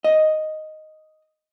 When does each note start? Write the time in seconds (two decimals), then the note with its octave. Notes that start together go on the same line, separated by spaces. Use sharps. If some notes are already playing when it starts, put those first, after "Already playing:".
0.04 D#5